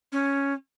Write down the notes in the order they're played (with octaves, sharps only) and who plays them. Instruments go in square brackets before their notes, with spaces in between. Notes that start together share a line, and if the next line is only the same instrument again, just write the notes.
[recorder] C#4